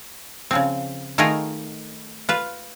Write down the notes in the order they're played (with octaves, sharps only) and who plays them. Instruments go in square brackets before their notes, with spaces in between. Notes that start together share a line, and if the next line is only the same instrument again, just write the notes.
[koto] C#3 F3 C4
D#3 A3 D#4 F4 G#4 A#4
F4 B4